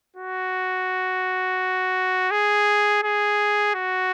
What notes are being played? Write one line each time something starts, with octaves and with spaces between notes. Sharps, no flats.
F#4
G#4
G#4
F#4